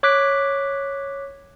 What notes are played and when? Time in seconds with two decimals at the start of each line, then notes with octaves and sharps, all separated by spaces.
0.03 C#5 D6 F#6 B6